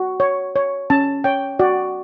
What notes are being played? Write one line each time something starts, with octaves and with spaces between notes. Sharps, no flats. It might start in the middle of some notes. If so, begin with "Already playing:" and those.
Already playing: F#4
C#5
C#5
C#4 A5
C#5 G5
F#4 D5